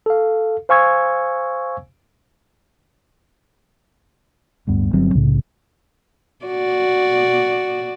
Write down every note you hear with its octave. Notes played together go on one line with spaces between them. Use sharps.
A4 F5
C5 F5 G#5 C#6 E6 G#6
D1 G2 B3
G1 F#3 C4
C2 A2 C#3
F#4 D5